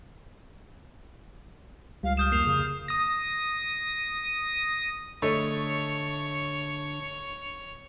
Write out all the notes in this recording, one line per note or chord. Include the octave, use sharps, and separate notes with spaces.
C#2 G3 F5
D#6 F6 G6 E7
F2 A#3 C7 E7 F7
C#3
D#6 A#6
D3 A3 C#5 D#5